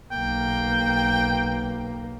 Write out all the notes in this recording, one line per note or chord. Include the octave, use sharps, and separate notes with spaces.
B1 A#3 G5